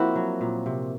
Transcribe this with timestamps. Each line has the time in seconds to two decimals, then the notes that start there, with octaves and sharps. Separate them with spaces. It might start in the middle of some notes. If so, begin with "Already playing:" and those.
Already playing: F3 A#3 C4 E4 F#4
0.16 F#3
0.41 A#2
0.66 C3